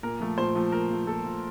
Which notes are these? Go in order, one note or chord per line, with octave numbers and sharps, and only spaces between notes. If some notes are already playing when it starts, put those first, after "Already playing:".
A#2 A#4
F3 A3
A#2 C5
F3 A3
A#2 A#4
F3 A3
A#2 A4
F3 A3